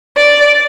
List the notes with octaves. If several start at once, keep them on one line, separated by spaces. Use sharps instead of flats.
D5